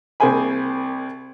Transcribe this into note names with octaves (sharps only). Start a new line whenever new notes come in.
C2 A#3 G#4 C5 G#5 B5